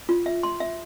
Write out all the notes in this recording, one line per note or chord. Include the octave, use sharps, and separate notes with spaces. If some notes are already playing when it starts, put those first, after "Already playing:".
F4
E5
C6
E5